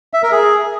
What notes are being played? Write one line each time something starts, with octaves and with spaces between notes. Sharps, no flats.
E5
A#4
G#4